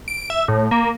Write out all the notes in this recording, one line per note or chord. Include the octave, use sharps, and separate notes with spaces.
D7
E5
A2
A#3